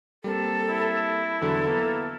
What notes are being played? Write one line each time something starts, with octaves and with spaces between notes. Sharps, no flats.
G3 A#3 C4 A4
E4
E2 D3 F#3 A4
A#3 B3 E4